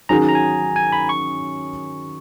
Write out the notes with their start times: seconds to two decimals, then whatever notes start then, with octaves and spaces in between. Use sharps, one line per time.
0.09 D#3 F#3 C#4 G#4 A#5
0.29 A#5
0.35 G#5
0.76 G#5
0.92 B5
1.09 C#6